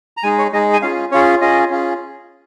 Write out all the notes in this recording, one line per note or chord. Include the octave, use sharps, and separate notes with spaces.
A#5
G#3 D#4 G#4 G#5
C#5
G#3 D#4 G#4 D#5
G#5
C#4 F4 G#4 F5
C#4 F4 G#4 C#5
C#4 F4 G#4 D#5
C#4 F4 G#4